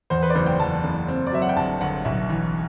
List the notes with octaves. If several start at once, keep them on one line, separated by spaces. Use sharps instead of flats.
E2 C5
B4
D5
F#1 C5
G5
E2 A5
F#1
C4
D5
F#3 E5
F#5
G5
G1 A5
G1 F#5
B1 E5
E3